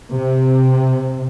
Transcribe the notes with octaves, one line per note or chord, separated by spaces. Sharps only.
C3